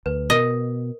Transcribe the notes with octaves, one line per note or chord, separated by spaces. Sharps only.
D2 B4
B2 A#4 D#5